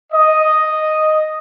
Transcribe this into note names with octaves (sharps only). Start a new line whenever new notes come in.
D#5